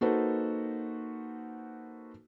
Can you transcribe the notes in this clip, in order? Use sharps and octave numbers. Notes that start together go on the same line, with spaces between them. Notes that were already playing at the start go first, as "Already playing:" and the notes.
A#3 D#4 F#4 A4 B4 C5